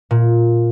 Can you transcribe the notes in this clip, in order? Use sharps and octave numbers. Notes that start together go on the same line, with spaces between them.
A#2